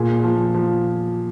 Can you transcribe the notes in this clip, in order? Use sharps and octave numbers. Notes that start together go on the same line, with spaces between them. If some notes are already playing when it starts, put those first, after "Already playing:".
Already playing: A#2 G#4
F3
F3